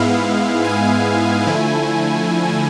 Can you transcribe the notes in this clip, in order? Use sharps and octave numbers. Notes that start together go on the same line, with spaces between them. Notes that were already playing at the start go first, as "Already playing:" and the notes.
Already playing: G#2 G#3 B3 E4 F5
G#5
D3 F3 A3 E4